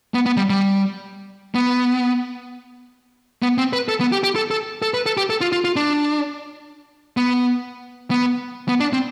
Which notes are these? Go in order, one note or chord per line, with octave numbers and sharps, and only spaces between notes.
B3
B3
G3
G3
B3
B3
C4
B4
A4
B3
G4
G4
A4
A4
A4
B4
A4
G4
A4
F4
F4
F4
D4
B3
B3
B3
D4
C4